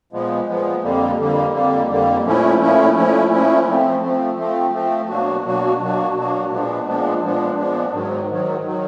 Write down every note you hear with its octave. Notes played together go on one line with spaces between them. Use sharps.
A#2 F3 G#3 B3
A#2 F3 G#3 B3
F2 D3 G3 A#3
F2 D3 G3 A#3
F2 D3 G3 A#3
F2 D3 G3 A#3
A#2 F3 A3 C#4 E4
A#2 F3 A3 C#4 E4
A#2 F3 A3 C#4 E4
A#2 F3 A3 C#4 E4
F3 A3 C4
F3 A3 C4
F3 A3 C4
F3 A3 C4
B2 F#3 A#3 D4 F#4
B2 F#3 A#3 D4 F#4
B2 F#3 A#3 D4 F#4
B2 F#3 A#3 D4 F#4
A#2 F3 G#3 B3 D4
A#2 F3 G#3 B3 D4
A#2 F3 G#3 B3 D4
A#2 F3 G#3 B3 D4
G#2 D#3 F#3
G#2 D#3 F#3
D#3 F#3